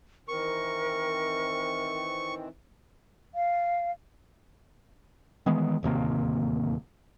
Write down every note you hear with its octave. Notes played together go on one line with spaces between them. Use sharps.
D#3 E3 C4 A#4 C#6
F5
D#3 E3 G#3 B3
D1 D#2 C3 A#3